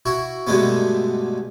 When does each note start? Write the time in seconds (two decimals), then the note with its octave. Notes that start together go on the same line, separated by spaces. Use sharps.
0.06 E4 F#4
0.47 G2 B2 D3 G#3 A3 B3